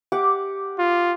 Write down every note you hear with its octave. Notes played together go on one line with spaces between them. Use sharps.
G4 F#5 D6
F4